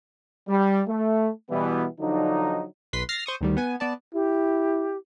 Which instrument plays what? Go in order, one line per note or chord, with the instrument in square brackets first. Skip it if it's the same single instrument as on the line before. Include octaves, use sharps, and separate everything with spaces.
[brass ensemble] G3
A3
B2 E3 G3 B3
D3 F3 F#3 D4 D#4
[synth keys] B1 B4 C6 B6
F6 A6 A#6 C7
C5 C#6 D#6
D2 D#3 G3
B3 G#5
B3 D5 A5
[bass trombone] E4 [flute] G4